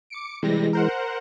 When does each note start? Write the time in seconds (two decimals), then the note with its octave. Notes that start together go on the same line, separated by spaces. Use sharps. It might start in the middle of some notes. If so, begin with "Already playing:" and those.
0.10 D6 C#7 D7
0.43 C3 E3 G3 G#3 A#6
0.73 A#4 C5 F#5